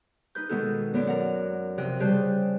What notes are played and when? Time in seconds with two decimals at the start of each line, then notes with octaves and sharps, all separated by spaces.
0.35 D#4 B4 G6
0.49 B2 D#3 G#3 B3 F#4 A4
0.94 F#2 B3 D5
1.07 A#4 F#5
1.78 C3 F3 D#5 G5 F#6
2.00 C#3 G3 G4 C5 A5 F#6